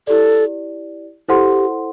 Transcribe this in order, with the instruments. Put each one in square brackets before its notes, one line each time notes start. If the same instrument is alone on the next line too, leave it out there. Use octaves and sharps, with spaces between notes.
[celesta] E4 G4 D5 [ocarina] A4
[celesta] E4 A4 C5 F#5 C6 [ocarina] G4